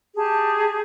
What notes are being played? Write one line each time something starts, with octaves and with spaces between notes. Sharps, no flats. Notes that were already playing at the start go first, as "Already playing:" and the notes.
G4 G#4 A5